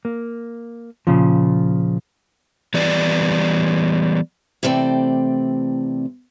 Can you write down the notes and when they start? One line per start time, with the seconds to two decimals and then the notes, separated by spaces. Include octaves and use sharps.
0.05 A#3
1.07 A#2 C#3 F3
2.74 E3 G3 B3 D5
4.63 C3 E3 A3 C4 D5 G5